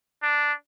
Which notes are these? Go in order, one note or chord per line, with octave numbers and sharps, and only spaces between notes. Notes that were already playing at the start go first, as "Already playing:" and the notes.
D4